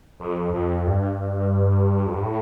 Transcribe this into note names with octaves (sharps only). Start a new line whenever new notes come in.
F2
F2
G2
F2
G2
A2